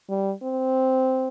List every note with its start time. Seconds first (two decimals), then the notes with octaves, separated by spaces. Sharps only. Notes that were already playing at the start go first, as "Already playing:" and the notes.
0.09 G3
0.43 C4